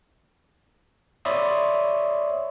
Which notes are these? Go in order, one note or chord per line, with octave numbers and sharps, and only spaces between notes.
C#5 D5 E5 B5 C6 D#6